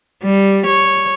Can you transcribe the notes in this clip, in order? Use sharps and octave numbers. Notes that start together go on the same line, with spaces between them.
G3
C#5